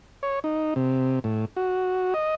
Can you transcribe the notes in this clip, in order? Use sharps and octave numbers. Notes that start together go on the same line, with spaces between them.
C#5
D#4
C3
A2
F#4
D#5